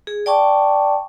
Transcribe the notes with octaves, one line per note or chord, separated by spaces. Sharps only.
G#4
D5 G5 A5 C#6 D6